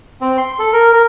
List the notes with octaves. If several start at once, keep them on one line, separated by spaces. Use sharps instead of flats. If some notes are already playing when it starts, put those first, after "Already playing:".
C4
C6
A4
A#4
A#4